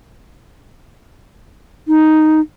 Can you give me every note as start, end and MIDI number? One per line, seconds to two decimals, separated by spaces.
1.88 2.40 63